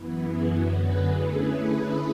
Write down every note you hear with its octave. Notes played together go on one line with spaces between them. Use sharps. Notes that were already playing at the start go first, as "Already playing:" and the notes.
Already playing: F#2 E3 B3 E4
G#4
F#2 D3 F#3 B3 F#4 A4
G#4 B4
D3 A3 C#4 E4 G#4 B4